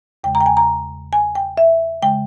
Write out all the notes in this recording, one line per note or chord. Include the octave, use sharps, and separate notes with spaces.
E2 C#3 G#3 G5
A#5
G5
G#5
A#5
G#5
G5
E5
C#3 G#3 G5